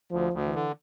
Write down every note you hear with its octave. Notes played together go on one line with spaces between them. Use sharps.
D2 F3
D2
E3
D3